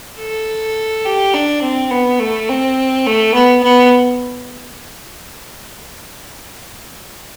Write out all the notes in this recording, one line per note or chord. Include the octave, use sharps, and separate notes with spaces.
A4
G4
D4
C4
B3
A3
C4
A3
B3
B3